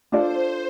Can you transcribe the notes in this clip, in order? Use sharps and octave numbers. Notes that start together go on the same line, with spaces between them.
D4 F4 A4 C5 D5